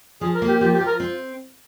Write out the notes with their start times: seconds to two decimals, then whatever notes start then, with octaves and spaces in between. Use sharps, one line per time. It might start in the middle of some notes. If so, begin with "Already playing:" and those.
0.21 F3 G#4
0.35 A#4
0.42 A#3
0.48 G4
0.60 F3 G4
0.74 G4
0.80 F4
0.86 A#4
1.00 C4